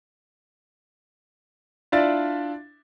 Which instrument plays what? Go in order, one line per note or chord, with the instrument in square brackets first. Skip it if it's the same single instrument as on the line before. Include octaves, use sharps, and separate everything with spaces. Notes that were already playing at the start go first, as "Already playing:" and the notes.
[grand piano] D4 E4 F4 D5 E5 A6